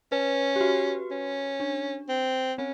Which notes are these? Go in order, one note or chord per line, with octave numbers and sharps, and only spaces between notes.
C#4 B4
G4
F#4
C#4
D4
C4
C4 C#4